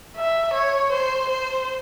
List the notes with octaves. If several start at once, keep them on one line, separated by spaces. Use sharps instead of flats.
E5
C#5
C5
C5